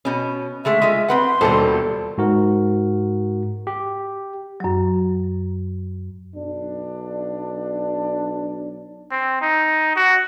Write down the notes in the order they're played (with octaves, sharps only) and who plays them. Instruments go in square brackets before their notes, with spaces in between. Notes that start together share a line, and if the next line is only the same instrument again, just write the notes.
[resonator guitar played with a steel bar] B2 C#4
[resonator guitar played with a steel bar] D3 G#3 A3 [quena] E5
[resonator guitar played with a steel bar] G#3 F4
[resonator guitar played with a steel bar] C4 B4 F#5 [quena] C6
[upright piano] D#1 A4 [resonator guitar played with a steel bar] B2 D4 C5
[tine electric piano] G#2 F#4 A#4
G4
[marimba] F#2 F#3
[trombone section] B1 D4
[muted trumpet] C4
D#4
F#4